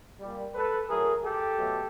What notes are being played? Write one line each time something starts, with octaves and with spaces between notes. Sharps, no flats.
A#2 G3
A4 B4
A2 F#3 A3 G#4 A#4
G4 A4
B2 F#3 A3